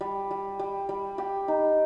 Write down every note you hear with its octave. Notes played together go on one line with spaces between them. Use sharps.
G3
G3
G3
G3
G4
D#4